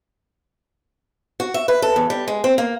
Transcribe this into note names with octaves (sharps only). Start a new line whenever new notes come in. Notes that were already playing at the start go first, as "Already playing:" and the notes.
F#4
E5
B4
A4
E2
G3
G#3
C4
A#3